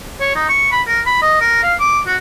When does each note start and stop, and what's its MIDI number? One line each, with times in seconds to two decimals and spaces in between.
0.20 0.34 73
0.35 0.44 63
0.49 0.69 85
0.72 0.81 83
0.87 1.01 70
1.06 1.18 83
1.22 1.37 75
1.41 1.59 70
1.63 1.73 77
1.80 2.00 86
2.07 2.16 66